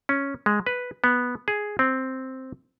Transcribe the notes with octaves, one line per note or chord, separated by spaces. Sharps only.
C#4
G#3
B4
B3
G#4
C4